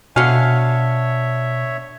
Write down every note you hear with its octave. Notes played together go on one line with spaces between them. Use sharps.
B2 D3 F#4 C#5 E5 F5 G#5